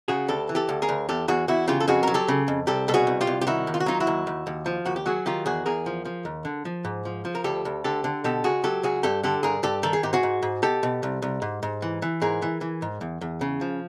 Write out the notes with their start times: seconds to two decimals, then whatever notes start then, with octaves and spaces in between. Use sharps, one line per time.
0.08 C#3 F#4 G#4
0.28 D2 G4 A4
0.49 E3
0.55 G4 A4
0.69 D2
0.82 G#4 A#4
0.89 D2
1.09 E2 G4 A4
1.28 E2 F#4 G#4
1.48 E2 E4 F#4
1.68 C#3 F4 G4
1.80 A4
1.88 F2 F#4 G#4
2.03 F#3 A#4
2.14 G4 A4
2.28 C#3
2.48 F2
2.67 C2 G4 A4
2.88 B2 A4
2.94 F#4 G#4
3.07 C2
3.21 F4 G4
3.27 C2
3.41 G4
3.47 D#3 E4 F#4
3.67 D#2
3.74 F4
3.80 F#4
3.86 F#3 D#4 F4
4.00 E4 F#4
4.07 D#2
4.27 D#2
4.47 D#2
4.66 F3
4.85 D#2 F#4
4.96 G4
5.06 F#3 F#4 G#4
5.26 D#3 F4 G4
5.46 E2 F#4 G#4
5.66 E2 G#4 A#4
5.86 F3
6.05 F3
6.25 D#2
6.45 D3
6.65 F3
6.85 G#2
7.05 F3
7.25 F3
7.35 A#4
7.44 D2 G4 A4
7.65 D2
7.84 D3 G4 A4
8.04 D3
8.24 B2 G4 A4
8.44 C#2 F#4 G#4
8.64 F#3 G4 A4
8.83 C#2 F#4 G#4
9.03 G2 G4 A4
9.24 D3 G4 A4
9.43 G2 G#4 A#4
9.63 G2 G4 A4
9.83 D#3 A4
9.93 G#4
10.03 G#2 G4
10.13 F#4 G#4
10.23 G#2
10.43 G#2
10.63 B2 G4 A4
10.83 B2
11.03 C2
11.22 C2
11.42 G#2
11.63 G#2
11.82 E3
12.02 E3
12.21 G#2 G#4 A#4
12.42 E3
12.61 E3
12.82 G#2
13.01 E2
13.21 E2
13.41 C#3
13.61 F3